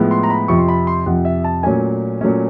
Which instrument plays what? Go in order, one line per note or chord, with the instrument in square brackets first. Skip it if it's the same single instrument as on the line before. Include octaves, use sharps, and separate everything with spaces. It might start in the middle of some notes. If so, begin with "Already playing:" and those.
Already playing: [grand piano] A2 F3 G#3 B3
C6
A#5
B5
F2 C3 F3 C#6
C6
B5
C6
F2 C3 F3 F#5
E5
A5
A#2 F#3 A3 C#4 G#5
A#2 F#3 A3 C#4